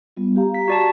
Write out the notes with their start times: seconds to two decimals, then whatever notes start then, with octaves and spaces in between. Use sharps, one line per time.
0.17 G3 B3 F4
0.36 G4 F5 A#5
0.54 B6
0.68 F#4 D5 A5